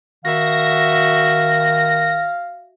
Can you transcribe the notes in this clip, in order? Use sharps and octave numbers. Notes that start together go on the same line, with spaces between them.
D#3 F#4 E5 F5 A#6